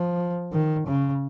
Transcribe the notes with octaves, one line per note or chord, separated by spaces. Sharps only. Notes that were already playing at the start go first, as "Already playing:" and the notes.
Already playing: F3
D#3
C#3